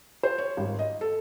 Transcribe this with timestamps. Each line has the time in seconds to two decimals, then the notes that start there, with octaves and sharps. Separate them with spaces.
0.23 C5
0.38 C#5
0.57 G#1
0.79 D#5
1.01 A4